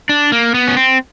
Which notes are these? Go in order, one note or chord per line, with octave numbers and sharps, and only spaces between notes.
D4
A#3
B3
C#4
C4